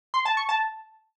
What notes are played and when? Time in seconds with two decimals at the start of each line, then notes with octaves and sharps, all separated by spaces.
0.14 C6
0.25 A5
0.37 C#6
0.49 A5